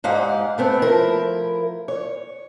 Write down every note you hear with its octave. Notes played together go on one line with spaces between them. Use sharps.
G#2 G#3 D#4 G4 F5 F#5
A3 B3 C4
F3 E4 A#4
C#5